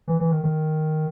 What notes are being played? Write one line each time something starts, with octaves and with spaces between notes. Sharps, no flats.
E3
E3
D#3
D#3